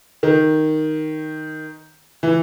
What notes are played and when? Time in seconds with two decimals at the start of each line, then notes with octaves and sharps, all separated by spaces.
0.23 D#3
2.23 E3